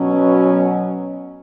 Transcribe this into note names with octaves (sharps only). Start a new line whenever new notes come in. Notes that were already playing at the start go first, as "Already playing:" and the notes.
Already playing: B2 F#3 C#4